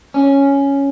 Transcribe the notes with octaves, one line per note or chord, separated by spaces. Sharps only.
C#4